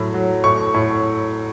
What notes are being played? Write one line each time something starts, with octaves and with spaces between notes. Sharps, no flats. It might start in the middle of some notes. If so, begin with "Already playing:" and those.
Already playing: A2 F#3
F#3
A2 C#6
A2